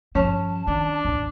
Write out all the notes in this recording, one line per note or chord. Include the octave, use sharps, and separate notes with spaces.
G2 F3 C#4 A5
D#3 D4
G#1 D2